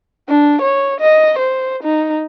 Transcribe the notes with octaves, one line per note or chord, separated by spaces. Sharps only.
D4
C#5
D#5
C5
D#4